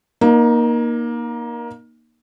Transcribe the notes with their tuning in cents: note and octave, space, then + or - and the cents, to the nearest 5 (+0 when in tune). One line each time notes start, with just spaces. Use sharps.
A#3 +20 D#4 -10